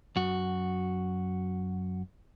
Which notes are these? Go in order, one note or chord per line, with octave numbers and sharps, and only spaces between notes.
F#2 F#4